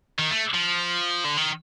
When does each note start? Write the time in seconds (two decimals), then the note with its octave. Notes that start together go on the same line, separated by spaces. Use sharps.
0.19 D#3
0.31 A3
0.55 F3
1.25 D3
1.37 D#3